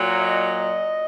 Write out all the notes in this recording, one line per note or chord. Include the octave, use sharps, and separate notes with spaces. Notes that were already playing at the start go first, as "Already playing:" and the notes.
Already playing: A#2 F#3
D#5